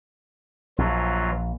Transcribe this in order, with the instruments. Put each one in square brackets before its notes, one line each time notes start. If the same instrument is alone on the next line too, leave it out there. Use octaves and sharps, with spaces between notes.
[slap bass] A#1 [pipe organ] E3 F#3 F4